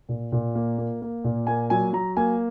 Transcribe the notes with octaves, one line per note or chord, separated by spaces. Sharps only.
A#2
A#2
A#3
A#3
A#3
A#2
A#3 G#5
F#3 G#5
F#3 A#5
A#3 G#5